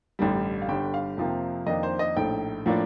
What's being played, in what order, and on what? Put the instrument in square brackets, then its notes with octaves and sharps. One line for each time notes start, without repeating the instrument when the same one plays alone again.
[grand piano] A1 G2 D3 G3
F5
G1 G2 D3 G3 G5
F5
F2 C3 F3 A#3
F2 D#3 A#3 D4 D#5
C5
D#5
A#1 A2 A3 D#4 G5
A2 F3 A#3 D4